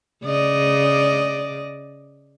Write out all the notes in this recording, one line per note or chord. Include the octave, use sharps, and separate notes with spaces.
C#3 D5 D#5